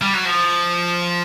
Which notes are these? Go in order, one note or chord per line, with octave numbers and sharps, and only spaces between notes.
G3
F#3
F3